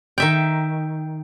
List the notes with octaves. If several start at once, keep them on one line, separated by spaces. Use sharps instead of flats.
D#3 E5 G5